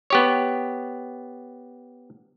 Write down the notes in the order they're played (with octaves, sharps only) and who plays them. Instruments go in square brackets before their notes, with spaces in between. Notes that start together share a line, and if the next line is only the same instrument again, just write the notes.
[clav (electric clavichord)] B3 G4 C#5